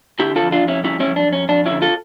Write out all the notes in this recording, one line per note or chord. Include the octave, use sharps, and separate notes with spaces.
D3 E4 G4
F4 A4
F2
D4 F4
F2
C#4 E4
G3 C#4 E4
C#4 E4
F2
D4
F2
C#4
F2 D4
D3 C#4 E4
F4 A4